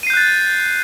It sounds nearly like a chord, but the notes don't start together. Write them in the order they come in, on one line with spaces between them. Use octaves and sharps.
D#7 C7 G6 F#6 A6